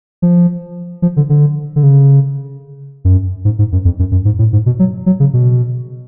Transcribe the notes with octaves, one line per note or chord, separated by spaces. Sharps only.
F3
F3
D3
D3
D3
C#3
F#2
G#2
G#2
F#2
F2
F#2
F#2
G#2
A2
G#2
B2
F#3
F#3
C#3
B2